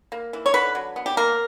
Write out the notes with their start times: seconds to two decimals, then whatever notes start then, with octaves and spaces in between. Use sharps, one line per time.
0.12 A#3
0.33 E3
0.46 C#5
0.54 D3 B4
0.75 F#3
0.96 B3
1.06 G4
1.17 A#3 A#4